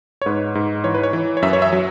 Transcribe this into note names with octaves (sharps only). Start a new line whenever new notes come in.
C#5
G#2 B4
G#2
E3 C#5
B4
C#5
E3
C#5
F#2 E5
C#5
E5
F#3